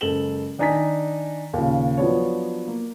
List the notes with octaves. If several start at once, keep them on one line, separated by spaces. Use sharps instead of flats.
F#1 G#3 A4 E7 F#7 G7
D#3 D4 D#4 G#5 A#5 B6
D#2 A#2 C#3
F3 F#3 B3 D4 C#5
A#3